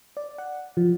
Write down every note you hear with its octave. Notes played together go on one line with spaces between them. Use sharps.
D5
F#5
F3